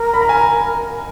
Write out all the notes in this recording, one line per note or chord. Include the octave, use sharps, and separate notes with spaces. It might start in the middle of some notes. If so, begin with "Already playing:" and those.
Already playing: A#4
B5
A#5
G#5
A#5